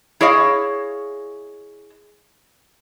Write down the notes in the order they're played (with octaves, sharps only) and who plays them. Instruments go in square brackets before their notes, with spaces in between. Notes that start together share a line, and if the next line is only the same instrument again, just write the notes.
[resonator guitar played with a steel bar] E4 G#4 C#5 D#5 F5